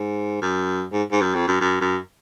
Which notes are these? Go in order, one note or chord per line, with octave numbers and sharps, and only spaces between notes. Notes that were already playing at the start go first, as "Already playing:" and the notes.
Already playing: G#2
F#2
G#2
G#2
F#2
F2
F#2
F#2
F#2